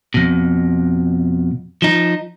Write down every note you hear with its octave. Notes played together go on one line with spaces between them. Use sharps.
F2 B2
F3 D#4